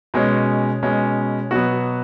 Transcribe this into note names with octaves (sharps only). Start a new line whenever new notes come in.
B2 G#3 C#4
B2 G#3 C#4
B2 F#3 B3 F#4